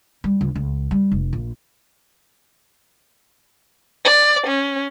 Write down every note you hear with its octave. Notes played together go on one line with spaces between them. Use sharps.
G3
C#2
C#2
G3
F1
A#1
D5
C#4